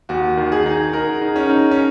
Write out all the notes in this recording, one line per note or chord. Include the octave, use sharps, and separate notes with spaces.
D#2 F#4
D#3
G#4
D#4
D#4 A#4
D#4
C#4
D#4
C#4